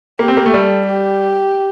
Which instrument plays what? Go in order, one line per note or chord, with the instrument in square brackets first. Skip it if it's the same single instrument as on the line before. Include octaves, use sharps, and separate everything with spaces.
[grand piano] A#3 [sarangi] G4
[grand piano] C4
A#3
A3
[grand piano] G3 [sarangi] A4
[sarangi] G4